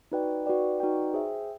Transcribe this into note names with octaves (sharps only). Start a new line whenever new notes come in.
D#4 F#4 B4 D5 G5
D#4 F#4 B4 D5 G5
D#4 F#4 B4 D5 G5
G#4 C5 E5 G5